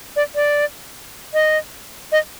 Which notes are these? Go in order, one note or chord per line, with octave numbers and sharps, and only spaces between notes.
D5
D5
D#5
D#5